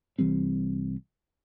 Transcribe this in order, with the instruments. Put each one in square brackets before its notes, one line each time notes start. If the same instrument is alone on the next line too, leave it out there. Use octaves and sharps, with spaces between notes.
[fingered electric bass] C2 E3 G3 C4